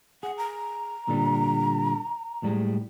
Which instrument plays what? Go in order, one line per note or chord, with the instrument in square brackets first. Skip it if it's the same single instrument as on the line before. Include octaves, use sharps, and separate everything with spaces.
[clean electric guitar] G#4 [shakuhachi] F#5
[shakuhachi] A#5
[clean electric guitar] A#2 D3 G3
A2 G3 G#3